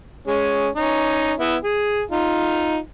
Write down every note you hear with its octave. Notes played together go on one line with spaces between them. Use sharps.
G#3 C#4
C#4 D#4
B3 E4 E5
G#4
D#4 F4